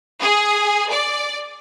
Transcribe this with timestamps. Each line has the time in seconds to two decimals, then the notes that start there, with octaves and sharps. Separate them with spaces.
0.20 G#4
0.90 D5